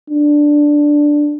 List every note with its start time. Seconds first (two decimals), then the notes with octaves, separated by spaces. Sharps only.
0.10 D4